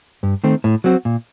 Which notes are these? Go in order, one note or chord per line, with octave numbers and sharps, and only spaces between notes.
G2
D#3 A3 C4
A2
F#3 C4 F#4
A#2